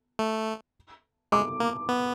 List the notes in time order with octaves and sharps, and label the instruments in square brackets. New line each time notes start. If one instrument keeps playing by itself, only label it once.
[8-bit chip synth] A3
[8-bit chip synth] G#3 [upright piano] D6
[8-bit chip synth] A#3
B3